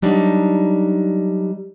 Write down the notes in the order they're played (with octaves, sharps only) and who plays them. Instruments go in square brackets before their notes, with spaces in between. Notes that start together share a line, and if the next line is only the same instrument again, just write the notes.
[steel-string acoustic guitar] F#3 G3 D4 D#4